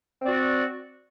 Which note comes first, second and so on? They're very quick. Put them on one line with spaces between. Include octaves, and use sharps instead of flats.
C4 D5 F#4